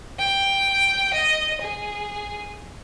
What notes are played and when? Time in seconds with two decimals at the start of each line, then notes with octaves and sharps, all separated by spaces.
0.19 G5
1.13 D#5
1.61 G#4